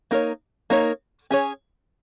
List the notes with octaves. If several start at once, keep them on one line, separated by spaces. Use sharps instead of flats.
A#3 D#4 A#4 C#5
A#3 D#4 A#4 C#5
C#4 G#4 C#5